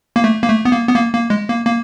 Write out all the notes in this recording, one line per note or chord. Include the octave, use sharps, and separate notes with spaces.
A#3
A3
A#3
A3
B3
A#3
B3
A#3
A#3
G#3
A#3
A#3